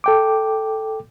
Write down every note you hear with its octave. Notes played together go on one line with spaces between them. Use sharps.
A4 G5 D6